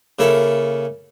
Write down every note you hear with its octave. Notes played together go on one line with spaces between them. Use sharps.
C#3 A#3 E4 A4